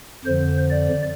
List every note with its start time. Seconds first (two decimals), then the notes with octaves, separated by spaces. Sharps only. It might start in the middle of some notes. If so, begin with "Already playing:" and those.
0.25 F2 D3 F3 C5
0.70 D5